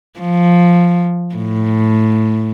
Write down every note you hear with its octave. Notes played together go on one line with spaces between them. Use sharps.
F3
A2